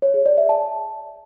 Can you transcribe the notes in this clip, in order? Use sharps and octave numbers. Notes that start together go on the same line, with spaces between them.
C#5
G#4
D5
E5
A5